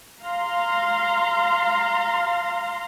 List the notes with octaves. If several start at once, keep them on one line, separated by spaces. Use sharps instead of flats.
F5 A#5 C6